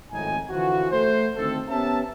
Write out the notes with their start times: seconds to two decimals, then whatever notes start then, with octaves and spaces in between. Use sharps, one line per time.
0.11 G#1 F2 A2 D#4 G#5
0.49 D3 E3 F3 F#4
0.91 A3 C5
1.36 D2 D#3 C4 A4
1.69 B3 C#4 G4 A#4 E5 A5